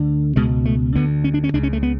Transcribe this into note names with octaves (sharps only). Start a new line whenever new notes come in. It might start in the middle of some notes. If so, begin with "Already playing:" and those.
Already playing: D2 D3
C#2 B2 G#3
A3
D2 D3 B3
C#4
D4
C#4
C#2 C#3 D4
C#4
A3
B3